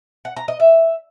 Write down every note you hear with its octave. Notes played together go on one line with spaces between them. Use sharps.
F#5
A#5
D#5
E5